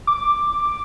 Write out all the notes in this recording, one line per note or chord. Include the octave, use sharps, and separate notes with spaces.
D6